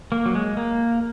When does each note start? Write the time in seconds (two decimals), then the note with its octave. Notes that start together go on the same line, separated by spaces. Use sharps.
0.12 A#3
0.26 F#3
0.35 G#3
0.57 A#3